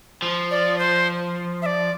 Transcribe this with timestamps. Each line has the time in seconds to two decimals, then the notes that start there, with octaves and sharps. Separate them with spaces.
0.22 F3
0.51 D5
0.78 C5
1.62 E5
1.66 D5